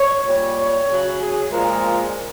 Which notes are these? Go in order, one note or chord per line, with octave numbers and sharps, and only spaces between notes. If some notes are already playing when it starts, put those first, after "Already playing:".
Already playing: C#5
A#2 G3
C#5
C#3 F#3
G#4
A#2 F3 G#3 A#4